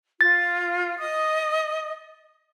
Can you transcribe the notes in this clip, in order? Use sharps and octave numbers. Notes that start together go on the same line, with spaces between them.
F4 A6
D#5 D#6